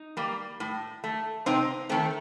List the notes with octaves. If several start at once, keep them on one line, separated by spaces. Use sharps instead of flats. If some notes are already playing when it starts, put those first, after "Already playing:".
Already playing: D#4
G3 A#3
A2
A3
C3 C4 D#4
D#3 A3 C4